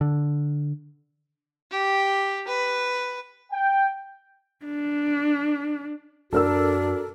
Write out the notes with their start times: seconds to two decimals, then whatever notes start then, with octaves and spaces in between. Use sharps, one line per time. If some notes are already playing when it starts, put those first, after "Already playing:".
0.01 D3
1.71 G4
2.48 B4
3.51 G5
4.65 D4
6.33 F#2 D4 F#4 A4 A#4 E6